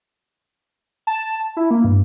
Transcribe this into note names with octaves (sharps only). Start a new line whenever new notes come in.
A5
E4
A#3
G2